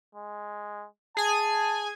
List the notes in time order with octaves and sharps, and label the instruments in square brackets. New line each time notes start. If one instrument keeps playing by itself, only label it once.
[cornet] G#3
[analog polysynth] G#4 G#5 [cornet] A5